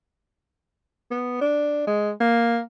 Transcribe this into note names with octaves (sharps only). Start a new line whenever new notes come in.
B3
D4
G#3
A#3